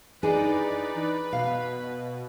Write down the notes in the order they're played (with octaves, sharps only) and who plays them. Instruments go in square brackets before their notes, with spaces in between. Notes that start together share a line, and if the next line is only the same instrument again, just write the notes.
[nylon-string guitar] E3 D4 G#4 [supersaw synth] D#4 D5 [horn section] B4
[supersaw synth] B2 [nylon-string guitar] F5